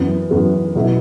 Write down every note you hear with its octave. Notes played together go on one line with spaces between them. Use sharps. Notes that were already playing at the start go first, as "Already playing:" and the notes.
Already playing: F#2 E3 B3
F#2 E3 B3
B2 F#3 B3 E4